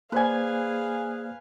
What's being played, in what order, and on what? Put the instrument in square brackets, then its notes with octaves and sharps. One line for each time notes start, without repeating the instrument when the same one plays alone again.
[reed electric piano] A#3 C5 D5 [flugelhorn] G#4 [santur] B4 G#5 [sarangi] F5